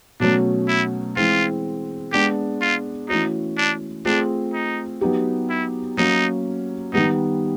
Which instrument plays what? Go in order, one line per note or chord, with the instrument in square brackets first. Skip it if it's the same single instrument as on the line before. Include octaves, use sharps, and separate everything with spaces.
[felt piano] B2 F#3 A3 C#4 [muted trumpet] D4
[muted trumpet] E4
[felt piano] E3 G#3 C4 [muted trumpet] F4
[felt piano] G#3 B3 D4 [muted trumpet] G4
[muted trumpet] F4
[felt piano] E3 A3 C#4 F#4 [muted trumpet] D#4
[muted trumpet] D4
[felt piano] A3 C4 F4 G#4 [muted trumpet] D4
[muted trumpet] D#4
[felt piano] F#3 B3 D#4 G4
[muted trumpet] E4
[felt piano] F#3 A#3 C#4 [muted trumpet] D#4
[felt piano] D#3 G3 B3 [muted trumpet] D#4